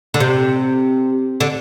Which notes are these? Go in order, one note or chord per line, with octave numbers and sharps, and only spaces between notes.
D3
C3
D3